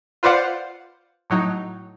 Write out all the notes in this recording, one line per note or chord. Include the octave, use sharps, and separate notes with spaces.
F4 B4 C5 D5 F5 F#5
A2 F#3 D#4